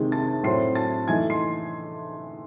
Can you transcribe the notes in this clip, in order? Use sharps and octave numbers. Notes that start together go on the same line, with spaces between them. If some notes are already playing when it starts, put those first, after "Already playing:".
Already playing: C3 D#3 G#3 D#4
A5 A6
A2 F#3 C4 E4 C6 C7
A5 A6
E3 A3 D#4 G#5 G#6
C6 C7